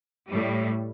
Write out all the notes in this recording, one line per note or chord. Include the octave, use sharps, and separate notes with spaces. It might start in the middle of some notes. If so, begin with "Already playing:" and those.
A2 G3